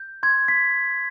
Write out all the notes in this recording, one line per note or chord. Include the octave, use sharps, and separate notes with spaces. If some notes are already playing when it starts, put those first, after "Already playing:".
Already playing: G6
C6 G#6
B6